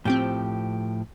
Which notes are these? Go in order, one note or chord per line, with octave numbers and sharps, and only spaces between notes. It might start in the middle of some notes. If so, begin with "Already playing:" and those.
A2 F3 C4 G4 G6